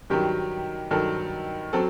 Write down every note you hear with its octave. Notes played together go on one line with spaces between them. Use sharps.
G2 D#3 F#3 G4
G2 D#3 F#3 A4
F#3 C4 A4